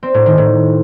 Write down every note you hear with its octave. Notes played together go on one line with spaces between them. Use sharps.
C4
A2
D#3
A2